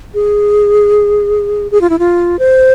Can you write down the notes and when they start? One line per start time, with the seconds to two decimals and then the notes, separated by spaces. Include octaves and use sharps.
0.14 G#4
1.71 G#4
1.81 F4
1.90 E4
1.99 F4
2.39 C5